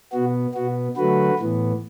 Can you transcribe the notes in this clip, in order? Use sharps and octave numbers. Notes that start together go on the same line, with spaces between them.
B2 B3 F#4
B2 B3 F#4
D3 F#3 A3 F#4 B4
A2 E3 B3